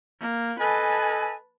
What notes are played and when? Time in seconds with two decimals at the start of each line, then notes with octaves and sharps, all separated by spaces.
0.21 A#3
0.60 A4 B4 D#5 G#5 A5